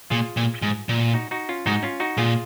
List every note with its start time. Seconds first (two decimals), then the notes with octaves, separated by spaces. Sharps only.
0.10 A#2 F4 G#4
0.37 A#2
0.62 G#2
0.89 A#2
1.14 D#4 F#4
1.31 D#4 F#4
1.49 C#4 F4
1.66 G#2 D#4 F#4
1.83 C#4 F4
2.00 D#4 F#4
2.17 A#2 F4 G#4